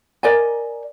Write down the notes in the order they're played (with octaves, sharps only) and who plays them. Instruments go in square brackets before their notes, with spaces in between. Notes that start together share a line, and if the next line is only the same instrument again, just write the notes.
[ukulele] A#4 D5 D#5 G#5